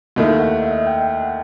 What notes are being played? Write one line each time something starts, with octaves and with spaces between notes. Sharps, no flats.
D#2 D#3 A3 E4 D#5
F#5
E5
D#5
E5
G5
F#5